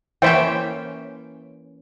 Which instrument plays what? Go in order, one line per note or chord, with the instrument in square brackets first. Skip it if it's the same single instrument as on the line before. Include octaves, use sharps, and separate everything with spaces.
[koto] E3 A#3 C#4 [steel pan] C5 E5 G5